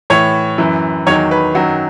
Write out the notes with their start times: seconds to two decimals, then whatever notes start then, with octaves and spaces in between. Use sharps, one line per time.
0.10 A2 E3 C#5
0.58 F#2 E3
1.06 E2 D#3 F#3 C#5
1.31 B4
1.55 F#2 D#3 F#3